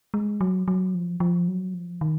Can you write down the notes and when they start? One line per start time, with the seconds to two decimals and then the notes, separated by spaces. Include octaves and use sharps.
0.14 G#3
0.41 F#3
0.68 F#3
0.95 F3
1.20 F3
1.48 F#3
1.74 F3
2.01 D#3